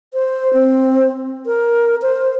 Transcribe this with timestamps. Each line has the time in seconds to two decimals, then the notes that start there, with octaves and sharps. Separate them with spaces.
0.14 C5
0.53 C4
1.46 A#4
2.02 C5